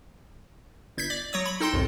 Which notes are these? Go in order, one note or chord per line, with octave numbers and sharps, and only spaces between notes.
G1 G6 G#6 B6
D5
F#3 C#5 D#6
B5
D#4 A4 G5 C6
G1 C2 F2 A2